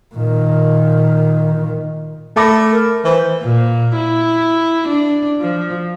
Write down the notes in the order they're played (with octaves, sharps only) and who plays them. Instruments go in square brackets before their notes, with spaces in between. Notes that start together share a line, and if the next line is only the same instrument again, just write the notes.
[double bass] A#2 D#3
[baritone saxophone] A3 [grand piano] B5 D6 A#6
[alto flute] A#4
[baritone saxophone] E3 [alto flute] C5
[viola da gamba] A#2
E4
D4
F3